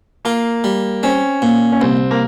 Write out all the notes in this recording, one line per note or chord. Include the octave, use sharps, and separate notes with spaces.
A#3 F4
G3
C4 C#4
A#2
C#4
C2 C4
A#3